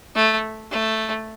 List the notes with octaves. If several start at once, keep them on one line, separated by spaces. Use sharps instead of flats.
A3
A3